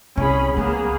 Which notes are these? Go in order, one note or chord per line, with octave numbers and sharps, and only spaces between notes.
C2 C#4 G#4 B5
C#2 F#3 A#3 B3 G#4